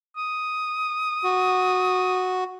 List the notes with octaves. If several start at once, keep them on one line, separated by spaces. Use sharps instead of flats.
D#6
F#4